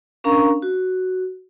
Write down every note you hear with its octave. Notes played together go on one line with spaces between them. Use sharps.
C#4 D4 A#4 F5 A#5 C#6
F#4